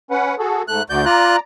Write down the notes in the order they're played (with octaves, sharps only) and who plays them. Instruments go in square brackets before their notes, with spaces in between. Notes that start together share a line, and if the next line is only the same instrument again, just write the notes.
[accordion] C#4 B4 F#5
F#4 G#4 A4
[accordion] G#2 A3 [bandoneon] F#6
[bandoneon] D2 G6 [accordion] F#4 D5
[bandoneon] F4 F#6 [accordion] D5 A#5